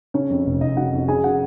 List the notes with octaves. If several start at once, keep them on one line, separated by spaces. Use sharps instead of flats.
C#3 C#4 C#5
F2
F1
F1 D#4 D#5
C#3 F#4 F#5
F2
C#3 G#4 G#5
F#4 F#5